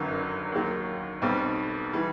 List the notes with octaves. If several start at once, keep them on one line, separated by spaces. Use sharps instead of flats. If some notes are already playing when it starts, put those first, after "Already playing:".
Already playing: G1 F#2 D#3 F#3
D#2 D#3 F#3
B1 B2 G3 C4
E3 G3